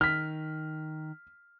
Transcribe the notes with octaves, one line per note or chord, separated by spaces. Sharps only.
D#3 F6 B6